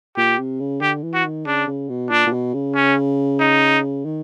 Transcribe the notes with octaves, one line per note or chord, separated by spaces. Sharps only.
A#2 G4
C3
C#3
D3 G4
E3
F#4
D#3
C#3 D4
C#3
B2
A#2 D4
A#2
B2
C#3
C#4
D#4
D#3